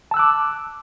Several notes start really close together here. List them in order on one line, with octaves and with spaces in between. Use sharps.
A5 E6 F#6 D6